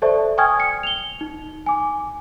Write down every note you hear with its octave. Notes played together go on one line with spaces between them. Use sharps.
A4 C5 D5 E5 A5 C#6
G5 G#5 C#6 D#6 F6 G#6
C#7
F7 G7
D#4
G#5 D6